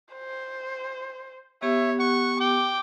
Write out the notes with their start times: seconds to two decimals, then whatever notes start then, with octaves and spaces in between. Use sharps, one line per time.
0.15 C5
1.62 B3 G4 C#5 E5
2.00 F#5 C#6
2.40 G5 D6